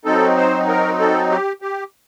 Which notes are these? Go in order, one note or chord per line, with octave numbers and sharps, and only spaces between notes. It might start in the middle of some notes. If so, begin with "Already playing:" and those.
F#3 C4 D#4 A4
C5
A#4
A4
G4
G4